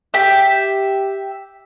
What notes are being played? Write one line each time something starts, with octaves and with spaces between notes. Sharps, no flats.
G4 E5